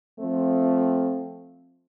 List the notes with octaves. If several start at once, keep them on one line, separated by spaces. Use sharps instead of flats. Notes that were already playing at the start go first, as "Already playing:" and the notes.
F3 A3 C4